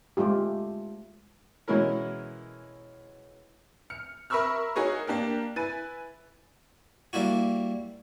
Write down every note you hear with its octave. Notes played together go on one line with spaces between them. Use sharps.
G#3 A3 F4 G4
B2 E3 G#3 C#4 E4 A#4
F6 C#7
A#4 E5 B5 C#6 E6 F6
D#4 F#4 G#4 A#4 C#5
A#3 D4 G4 A#4
E4 B4 G#5 A6 D#7
G3 A#3 E4 F#4